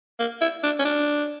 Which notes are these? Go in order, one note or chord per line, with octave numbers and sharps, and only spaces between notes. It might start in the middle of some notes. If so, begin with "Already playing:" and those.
A#3
E4
D4
C#4
D4